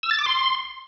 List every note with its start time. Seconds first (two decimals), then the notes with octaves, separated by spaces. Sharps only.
0.03 E6
0.11 A6
0.19 D6
0.26 C6